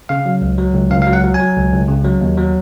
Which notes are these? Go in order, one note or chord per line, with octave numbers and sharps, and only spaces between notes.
C#3 F5
F#3
C#2
F#3
C#2
C#2 F5
F#3 F5
F#5
F#3
G#5
F#3
C#2
C#2
C#3
F#3
D#2
F#3